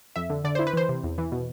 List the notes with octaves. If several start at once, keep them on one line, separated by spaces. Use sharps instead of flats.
F2 E5
D3
D3 D5
E4 C5
B4
E3 C5
C3
E2
E3
B2